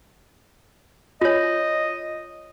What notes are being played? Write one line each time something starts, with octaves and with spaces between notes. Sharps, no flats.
F4 C#5 D#5